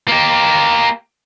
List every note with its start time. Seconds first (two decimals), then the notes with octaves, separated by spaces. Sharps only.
0.08 A#3 G4